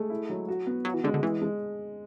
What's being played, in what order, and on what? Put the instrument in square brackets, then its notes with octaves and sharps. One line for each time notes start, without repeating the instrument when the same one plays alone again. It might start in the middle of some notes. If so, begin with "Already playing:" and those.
Already playing: [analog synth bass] G#3 [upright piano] A3
[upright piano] E4
F#3
F#4
B3
[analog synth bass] F#3 [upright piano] F#4
[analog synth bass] E3
[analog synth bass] D3 [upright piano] G#3
[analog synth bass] D3
[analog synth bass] E3 [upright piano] G#3
[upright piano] G#3